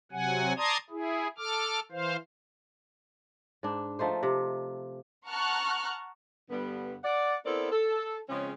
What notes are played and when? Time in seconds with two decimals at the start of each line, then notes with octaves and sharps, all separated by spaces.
0.12 C3 F#3 F#5 G#5
0.57 D5 A5 A#5 C6 D#6 G#6
0.90 E4 G#4
1.38 A4 D6 F6
1.92 E3 C5 F5
3.63 G#2 D4
3.99 F3 A3 D#4 C5
4.23 C3
5.27 F#5 A5 A#5 C#6 F6 F#6
6.51 G2 D3 G3 B3
7.04 D5 F#5
7.45 B3 C4 E4 A4 A#4 D5
7.71 A4
8.29 C#3 F3 G#3 C4 C#4